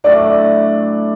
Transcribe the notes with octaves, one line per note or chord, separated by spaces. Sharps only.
A2 F#3 A3 D4 D5